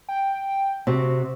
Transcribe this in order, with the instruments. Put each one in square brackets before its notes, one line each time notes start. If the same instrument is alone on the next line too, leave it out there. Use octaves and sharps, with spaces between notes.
[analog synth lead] G5
[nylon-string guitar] C3 [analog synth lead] F#4